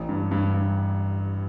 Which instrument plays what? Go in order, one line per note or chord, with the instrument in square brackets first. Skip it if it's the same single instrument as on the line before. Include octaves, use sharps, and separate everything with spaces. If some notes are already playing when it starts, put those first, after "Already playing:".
Already playing: [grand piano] A1
G2
G2
G2